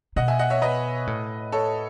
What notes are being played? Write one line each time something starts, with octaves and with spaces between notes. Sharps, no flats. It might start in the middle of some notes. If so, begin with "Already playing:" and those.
B2 D#5 F#5
E5 G#5
D#5 F#5
C#5 E5
B4 D#5
A2
A4 C#5